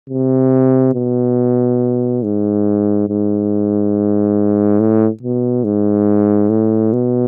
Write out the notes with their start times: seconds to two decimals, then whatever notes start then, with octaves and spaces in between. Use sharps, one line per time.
0.10 C3
0.94 B2
2.23 G#2
3.09 G#2
4.79 A2
5.22 B2
5.64 G#2
6.49 A2
6.93 B2